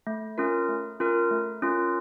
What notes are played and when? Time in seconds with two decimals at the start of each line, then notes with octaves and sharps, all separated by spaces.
0.07 A3
0.38 C#4 F4 A#4
0.68 A3
1.00 C#4 F4 A#4
1.31 A3
1.62 C#4 F4 A#4